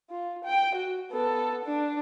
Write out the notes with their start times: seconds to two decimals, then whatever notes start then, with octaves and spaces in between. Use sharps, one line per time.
0.10 F4
0.44 G5
0.75 F#4
1.12 B3 A4
1.65 D4